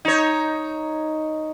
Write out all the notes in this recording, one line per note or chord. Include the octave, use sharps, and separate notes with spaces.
D#4 C#5